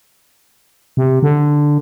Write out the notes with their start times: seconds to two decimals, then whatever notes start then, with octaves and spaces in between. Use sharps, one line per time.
0.97 C3
1.23 D3